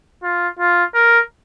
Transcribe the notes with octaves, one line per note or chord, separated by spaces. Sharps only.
F4
F4
A#4